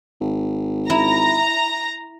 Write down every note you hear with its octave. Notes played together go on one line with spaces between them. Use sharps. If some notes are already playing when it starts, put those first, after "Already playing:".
G#1
E4 A#5